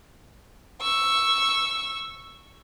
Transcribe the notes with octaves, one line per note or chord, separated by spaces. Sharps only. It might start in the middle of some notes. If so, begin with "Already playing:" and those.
C#6 E6